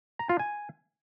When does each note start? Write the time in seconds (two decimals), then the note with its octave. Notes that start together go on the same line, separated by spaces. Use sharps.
0.19 A#5
0.29 F4
0.39 G#5